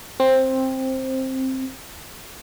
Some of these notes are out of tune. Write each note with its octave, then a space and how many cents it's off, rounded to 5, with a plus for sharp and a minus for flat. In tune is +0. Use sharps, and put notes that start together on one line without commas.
C4 +10